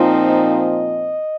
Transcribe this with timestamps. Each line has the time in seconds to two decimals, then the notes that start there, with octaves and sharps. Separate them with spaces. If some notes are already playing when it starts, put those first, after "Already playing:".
Already playing: A#2 F3 C4 D#4 F4
0.28 D#5